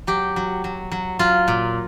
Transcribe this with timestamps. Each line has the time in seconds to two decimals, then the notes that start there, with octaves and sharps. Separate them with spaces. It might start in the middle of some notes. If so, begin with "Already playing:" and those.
0.07 F#3 G4
0.36 F#3
0.64 F#3
0.92 F#3
1.19 F#3 F4
1.48 A#2